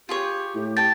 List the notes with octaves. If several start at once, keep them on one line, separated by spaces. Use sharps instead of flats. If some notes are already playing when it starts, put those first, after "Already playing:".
F4 G4 G#4 C#5
A2
G5 A5 A6